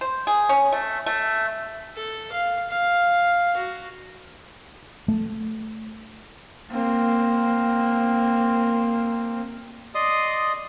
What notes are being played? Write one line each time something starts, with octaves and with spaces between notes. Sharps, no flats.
C5
G#4
C#4
A3
A3
A4
F5
F5
F#4
A3
A#3 C4
D5 D#5 C6 D#6